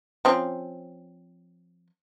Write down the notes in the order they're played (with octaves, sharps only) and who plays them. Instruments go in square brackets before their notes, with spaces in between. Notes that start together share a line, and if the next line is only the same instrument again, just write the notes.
[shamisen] F3 C4 C#4